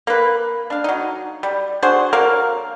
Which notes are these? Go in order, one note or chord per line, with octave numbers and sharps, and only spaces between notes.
A#3 B4
D4 F5
F#3 D#4
G3
D4 F#4 G#4 C5
F#3 A#3 A#4 F5